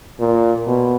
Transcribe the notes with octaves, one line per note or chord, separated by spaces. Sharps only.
A#2
B2